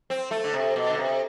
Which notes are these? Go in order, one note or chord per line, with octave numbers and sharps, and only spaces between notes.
C4
A3
D3
C3
B2
D3
C3